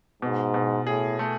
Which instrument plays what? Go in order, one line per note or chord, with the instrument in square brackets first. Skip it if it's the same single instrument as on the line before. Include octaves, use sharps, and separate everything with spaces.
[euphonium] G#2 [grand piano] B2
[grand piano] B2
[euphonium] A2 [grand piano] G#4
[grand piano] A3